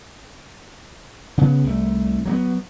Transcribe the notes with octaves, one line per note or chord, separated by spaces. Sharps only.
C#3 B3
C2 A3
F#3 A3 B3